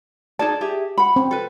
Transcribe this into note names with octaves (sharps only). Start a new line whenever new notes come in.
D#4 G#4 D5 A5
G4 G#4 E5
F#5 B5
C4
A4 B4